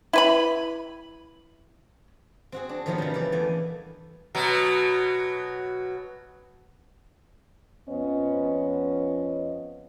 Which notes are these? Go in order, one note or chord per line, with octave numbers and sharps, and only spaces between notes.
E4 B4 B5
C4 F#4 G#4
D4
A#2 D#3 F3 F#3 A#3 B3
C#3 G3
E3 D5
E2 A3 G#5
B2 F#3
F2 F3 B3 C#4 D#5